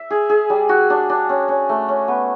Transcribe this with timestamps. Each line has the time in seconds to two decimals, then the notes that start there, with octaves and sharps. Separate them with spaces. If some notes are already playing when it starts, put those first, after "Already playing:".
Already playing: E5
0.10 G#4
0.29 G#4
0.50 G3
0.69 F#4
0.90 D4
1.10 D4
1.29 C#4
1.48 C#4
1.69 A3
1.89 C#4
2.08 B3